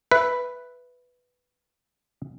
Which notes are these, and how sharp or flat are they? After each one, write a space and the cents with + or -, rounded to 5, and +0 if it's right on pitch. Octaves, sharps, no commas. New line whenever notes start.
B4 +0 E5 +10